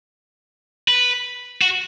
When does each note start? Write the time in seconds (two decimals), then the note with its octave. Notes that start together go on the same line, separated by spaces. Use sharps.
0.88 B4
1.61 F#4